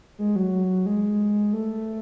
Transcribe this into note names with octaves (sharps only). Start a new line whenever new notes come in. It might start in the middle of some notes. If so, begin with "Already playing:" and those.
G#3
F#3
G#3
A3